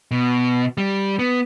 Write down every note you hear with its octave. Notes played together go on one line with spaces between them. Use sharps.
B2
G3
B3